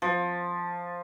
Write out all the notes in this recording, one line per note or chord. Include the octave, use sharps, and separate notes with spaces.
F3